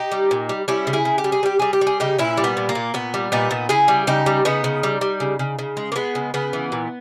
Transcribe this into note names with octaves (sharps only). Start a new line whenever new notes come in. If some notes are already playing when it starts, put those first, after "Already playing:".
Already playing: D#4 G4
G3
A#2
G3
G3 C#4 E4
C#3
E4 G#4
C#3
G4
G3
G#4
G3 G4
G3 G#4
G4
G3
G#4
C#3 D#4 G4
A#2 C#4 E4
G3
B3
A#2
A#3
A#2
A#2 B3
G3
A#2 B3 D#4
A#2
C#3 E4 G#4
G3
C#3 D#4 G4
G3
C#3 B3 D#4
C#3
G3
G3
C#3
C#3
C#3
G#3
A#3
G#3 B3
C#3
C#3 B3
E3
A#2